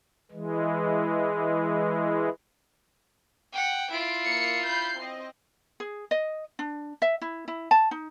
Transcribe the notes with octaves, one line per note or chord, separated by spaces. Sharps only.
E3 G#3
F#5 G5
E4 F4 C6 D7
A#3 C7 C#7
B5 G6 C7
C4 D#5
G#4
D#5
D4
E5
E4
E4
A5
D#4